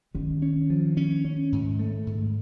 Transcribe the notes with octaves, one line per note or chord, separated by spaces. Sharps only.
D#3 C#4
C#4
F3
C#4
C#4
G#2
A3
G#2